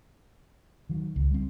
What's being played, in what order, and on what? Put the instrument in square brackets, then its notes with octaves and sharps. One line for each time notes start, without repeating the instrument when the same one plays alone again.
[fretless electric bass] D#3 F#3
C#2
G3 C4